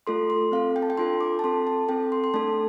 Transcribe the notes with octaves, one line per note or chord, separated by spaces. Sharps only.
A3 F4 A4 C6
C6
C4 A4 F5
G5
A5
G5
D4 F4 A4 C6
D6
A5
C4 A4 C6
A5
C4 A4 G5
C6
C6
A3 D4 A4 A5